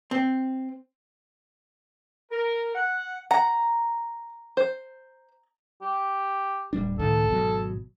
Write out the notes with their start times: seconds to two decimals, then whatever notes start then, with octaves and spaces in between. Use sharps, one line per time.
0.11 C4
2.31 A#4
2.75 F#5
3.31 F#5 A#5
4.57 C5
5.82 G4
6.73 D1 G3 D4
7.00 C#2 A2 D#3 A4
7.28 G#1 B2 F#3